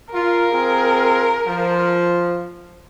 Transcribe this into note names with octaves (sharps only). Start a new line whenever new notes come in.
F4 A#4
C4 F4 G#4
F3